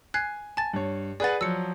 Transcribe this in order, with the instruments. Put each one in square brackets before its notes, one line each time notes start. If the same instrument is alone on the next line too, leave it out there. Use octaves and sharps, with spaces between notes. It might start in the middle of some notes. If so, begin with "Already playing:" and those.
[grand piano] G#5 [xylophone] F#6 G#6 C7
[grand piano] G#5 [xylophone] A5 A6
[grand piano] G2 C#5
[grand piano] G#4 B4 F#5 [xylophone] D5 A6
[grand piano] F3 F#3 [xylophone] E6 C#7